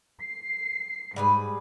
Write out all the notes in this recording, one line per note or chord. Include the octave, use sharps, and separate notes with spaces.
C7
G#2 G3 G#4 B4